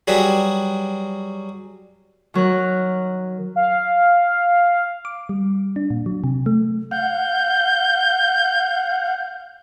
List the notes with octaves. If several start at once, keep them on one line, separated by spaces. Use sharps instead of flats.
F#3 G3 G#4 B4
D#3 F#3 A#4 F#6
F5
D6
G3
D4
A#2
F#3
C3
A3
F5 F#5 G6